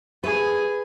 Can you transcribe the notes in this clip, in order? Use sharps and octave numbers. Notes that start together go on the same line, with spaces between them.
G#4 B4